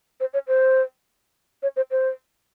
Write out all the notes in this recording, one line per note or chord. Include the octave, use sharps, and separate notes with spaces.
C5
C#5
C5
C#5
C5
C5